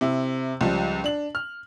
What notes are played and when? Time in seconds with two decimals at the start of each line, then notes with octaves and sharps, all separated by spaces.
0.01 C3 E4
0.61 C#2 F3 G3
1.04 D4 F#7
1.35 F6